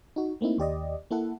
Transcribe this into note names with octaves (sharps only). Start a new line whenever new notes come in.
D#4 F#4
A3 A#3 C4 D#4 E4
D#2 G4 D5 D#5
A#3 E4 A4 F#5